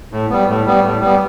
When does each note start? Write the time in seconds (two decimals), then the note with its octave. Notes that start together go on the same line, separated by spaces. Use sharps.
0.12 A2
0.30 G3 B3
0.48 A2
0.66 G3 B3
0.83 A2
1.01 G3 B3